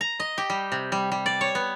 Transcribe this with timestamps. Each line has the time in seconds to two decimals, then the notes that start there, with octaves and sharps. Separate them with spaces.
0.01 A#5
0.20 D#5
0.38 G4
0.50 G3
0.72 C3
0.92 G3
1.12 G3
1.26 D5
1.41 C#5
1.55 B3